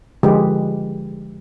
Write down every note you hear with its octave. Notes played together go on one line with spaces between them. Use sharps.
D3 F3 G#3 G4 B4